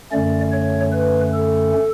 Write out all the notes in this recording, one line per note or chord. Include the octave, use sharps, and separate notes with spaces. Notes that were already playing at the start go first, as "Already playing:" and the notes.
F#2 D3 A3 C#4 D5
C#5
B4
A4